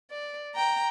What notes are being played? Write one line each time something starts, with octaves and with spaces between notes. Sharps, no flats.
D5
G5 A#5